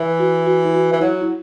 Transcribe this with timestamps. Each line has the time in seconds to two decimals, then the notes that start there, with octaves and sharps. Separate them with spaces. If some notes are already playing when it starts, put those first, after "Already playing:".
Already playing: E3
0.19 F#4
0.46 F#4
0.65 E4
0.74 F#4
0.93 E3
1.01 F#3 E4
1.21 E4